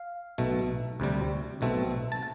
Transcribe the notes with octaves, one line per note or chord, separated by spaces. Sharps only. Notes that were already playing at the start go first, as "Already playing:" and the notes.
Already playing: F5
B1 B2 A3
D2 C3 G3
B1 B2 A3 C4
A5